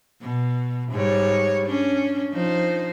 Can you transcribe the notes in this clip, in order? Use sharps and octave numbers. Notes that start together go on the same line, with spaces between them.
B2
G#2 G3 C#5
C#4 D4
F3 D#4 C5